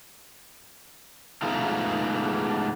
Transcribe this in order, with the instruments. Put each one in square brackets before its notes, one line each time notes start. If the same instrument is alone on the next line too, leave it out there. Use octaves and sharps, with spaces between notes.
[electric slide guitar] G#3 A3 B3 D#4 F4